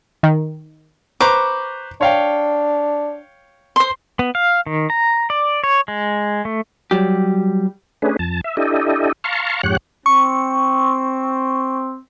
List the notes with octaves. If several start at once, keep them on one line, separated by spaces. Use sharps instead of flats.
D#3
B4 C5 A#5 C#6 D6
D4 C#5 F5 G5
C5 C6
B3
F5
D#3
A#5
D5
C#5
G#3
A3
F#3 G3 G4
A3 C#4 D4 G#4 B4
F2 A5
E5
D4 E4 G4 A4 D#5
F5 A5 A#5 C6 C#6
F2 G#2 G4 C#5 F#5 F#6
C4 C#6